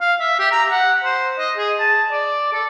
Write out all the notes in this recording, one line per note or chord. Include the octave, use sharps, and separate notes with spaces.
F5
E5
G4
A#5
F#5
C5
D#5
G#4
A5
D5
A4